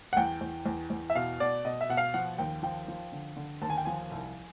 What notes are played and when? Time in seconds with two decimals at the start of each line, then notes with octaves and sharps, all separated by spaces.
0.13 F#5
0.17 E2 G5
0.41 E2
0.66 E2
0.90 E2
1.10 E5
1.15 B2 F5
1.40 B2 D5
1.65 B2 D#5
1.81 E5
1.89 B2 F#5
1.97 F5
2.14 F3 F#5
2.38 D#2 G5
2.63 F3 G5
2.88 F3
3.12 D3
3.37 D3
3.62 D#2 A5
3.70 G#5
3.78 G5
3.85 F3 G#5
4.11 C2